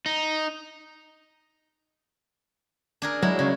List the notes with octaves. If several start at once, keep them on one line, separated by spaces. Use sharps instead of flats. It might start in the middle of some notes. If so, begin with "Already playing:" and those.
D#4
D4 G#4 A#4
F#3 G#3 E4
C#3